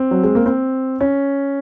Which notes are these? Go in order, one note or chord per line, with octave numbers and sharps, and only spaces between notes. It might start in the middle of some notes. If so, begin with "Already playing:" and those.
Already playing: C4
F#3
G#3
A#3
C4
C#4